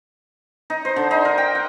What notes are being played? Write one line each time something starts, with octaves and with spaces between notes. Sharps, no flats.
D#4
C5
D3
D#4
A#4
G5
F#5